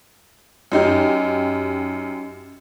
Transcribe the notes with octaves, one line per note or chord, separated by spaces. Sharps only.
F#2 D#4 G4